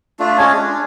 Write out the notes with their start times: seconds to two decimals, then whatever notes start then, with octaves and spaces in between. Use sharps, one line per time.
0.19 A3 D4 F4
0.38 G#3 C#4 D4 C#5
0.56 D4